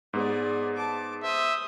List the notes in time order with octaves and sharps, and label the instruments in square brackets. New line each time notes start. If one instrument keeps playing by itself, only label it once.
[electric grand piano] G#2 B3 [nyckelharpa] G#4 D5
[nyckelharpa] A5 D6
[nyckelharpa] C5 D#6 [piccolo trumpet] E5